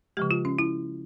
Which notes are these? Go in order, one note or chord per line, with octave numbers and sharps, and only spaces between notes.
C#3 F3 G#3 G4
F4
C#4
E4